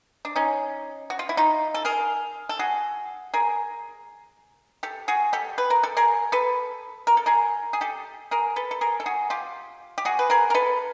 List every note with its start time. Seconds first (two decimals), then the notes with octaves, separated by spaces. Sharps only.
0.25 D4
0.36 C#4 D#4
1.10 F#4
1.19 F4
1.29 E4
1.37 D#4 F4
1.74 A4
1.85 G#4 A#4
2.49 A4
2.59 F#4 G#4
3.34 G#4 A#4
4.83 G4 A4
5.08 F#4 G#4
5.33 G4 A4
5.58 B4
5.70 A#4
5.83 A4
5.97 G#4 A#4
6.32 A4 B4
7.07 A#4
7.17 A4
7.26 G#4 A#4
7.73 G#4
7.81 G4 A4
8.31 G#4 A#4
8.56 A4 B4
8.71 A4
8.81 G#4 A#4
9.00 A4
9.06 F#4 G#4
9.30 F4 G4
9.98 G4
10.05 F#4 G#4
10.19 B4
10.30 G#4 A#4
10.50 A#4
10.54 A4 B4